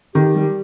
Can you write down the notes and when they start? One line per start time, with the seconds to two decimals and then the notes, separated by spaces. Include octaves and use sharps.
0.14 D#3 G4
0.35 G3